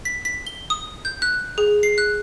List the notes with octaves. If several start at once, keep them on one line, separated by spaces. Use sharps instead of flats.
B6
B6
G7
D#6
G6
F#6
G#4
C7
F#6